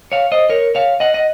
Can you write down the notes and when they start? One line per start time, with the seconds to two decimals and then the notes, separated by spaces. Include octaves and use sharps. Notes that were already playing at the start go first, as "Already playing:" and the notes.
0.12 C#5 F5
0.32 C5 D#5
0.49 A#4 C#5
0.75 C#5 F5
1.00 D#5 F#5
1.14 D#5